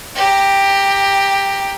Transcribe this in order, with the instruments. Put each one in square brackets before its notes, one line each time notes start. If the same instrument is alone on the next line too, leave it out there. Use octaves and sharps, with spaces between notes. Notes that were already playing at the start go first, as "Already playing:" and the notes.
[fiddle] G4 A#5